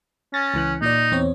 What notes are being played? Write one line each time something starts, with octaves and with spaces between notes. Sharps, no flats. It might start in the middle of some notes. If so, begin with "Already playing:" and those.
C#4 A6 A#6
C#2 E3 F#6
A#2 D#4 D5
E2 C4 C#5